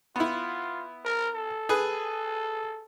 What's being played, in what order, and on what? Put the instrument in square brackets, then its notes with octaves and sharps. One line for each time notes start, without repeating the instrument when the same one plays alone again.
[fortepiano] B3 E4 [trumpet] F4
[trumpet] A#4
A4
[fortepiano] G#4 B4